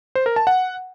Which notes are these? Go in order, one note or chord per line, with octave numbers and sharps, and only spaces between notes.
C5
A#4
A5
F#5